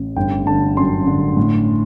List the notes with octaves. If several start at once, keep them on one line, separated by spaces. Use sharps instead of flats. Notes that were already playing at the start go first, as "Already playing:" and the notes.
Already playing: A1
G1 G5
D3 A5
F#2 C6
D3
A2